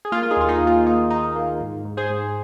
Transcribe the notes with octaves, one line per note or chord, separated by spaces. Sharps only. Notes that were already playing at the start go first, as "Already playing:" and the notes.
G#4
A#3 F4
F4
D#4 G#4
D#2 F4
D#4 G#4
D#2
F4
A#3 D#4
A#3 D#4
A#3
G#2
G#2
G#4 C5
G#2